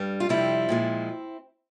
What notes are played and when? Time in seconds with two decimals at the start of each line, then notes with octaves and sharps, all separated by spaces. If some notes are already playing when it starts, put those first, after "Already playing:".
Already playing: G2 G3
0.20 F4
0.29 F2 C3 G3 C4 E4
0.69 A#2 F3 G#3